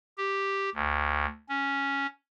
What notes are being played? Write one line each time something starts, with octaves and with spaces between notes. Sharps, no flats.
G4
D2
C#4